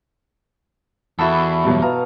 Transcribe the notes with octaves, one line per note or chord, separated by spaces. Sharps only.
E2 E4 F#4 A4 E5 B5
G2 B2 F#3
B2 F5 A5 A#5